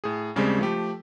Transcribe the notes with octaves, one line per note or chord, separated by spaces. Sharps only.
A2 G#4
D#2 C#3 G3 G#3 C4
F3 A3 G4